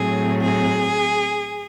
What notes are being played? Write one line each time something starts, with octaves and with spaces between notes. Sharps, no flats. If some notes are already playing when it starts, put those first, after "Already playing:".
Already playing: A2 F#3 C4 G#4
G#4